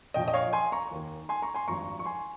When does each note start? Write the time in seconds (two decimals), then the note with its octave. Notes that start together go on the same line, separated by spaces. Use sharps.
0.14 A#1 A#2 F3 D#5 G5
0.28 D#5
0.34 C#5 F5
0.53 G#5 C6
0.72 A#5 C#6
0.91 D#2 D#3
1.29 G#5 C6
1.42 A#5 C#6
1.54 G#5 C6
1.68 G#1 G2 F3 A#5 C#6
1.99 C#6
2.05 G#5 C6